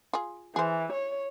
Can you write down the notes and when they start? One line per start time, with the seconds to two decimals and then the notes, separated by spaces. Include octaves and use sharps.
0.13 F4 G#4
0.56 E3 G#4 C5
0.93 C#5